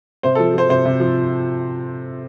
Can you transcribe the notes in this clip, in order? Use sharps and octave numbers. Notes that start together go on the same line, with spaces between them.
C3 C5
A4
F3
F3 C5
C3 C5
C3
F3